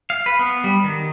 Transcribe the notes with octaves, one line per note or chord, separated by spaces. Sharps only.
F5
B4
B3
G3
D#3